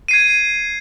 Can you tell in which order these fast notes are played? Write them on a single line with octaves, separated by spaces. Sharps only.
D#7 C7 G#6